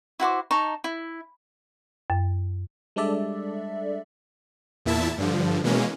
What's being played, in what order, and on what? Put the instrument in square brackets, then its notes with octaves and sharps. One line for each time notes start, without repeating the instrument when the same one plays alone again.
[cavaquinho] E4 F#4 C5 D6
D#4 A5 A#5 C#6
E4
[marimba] F#2
[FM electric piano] G3 G#3 D4 A4 D5 E5
[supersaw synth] E2 A#2 E4 E5 A5
G2 D3 F3
B2 E3 G#3 A#3 C#4